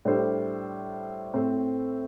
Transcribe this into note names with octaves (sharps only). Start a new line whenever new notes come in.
A2 G3 D4 A4 C5
A2 A3 C4 A4 C5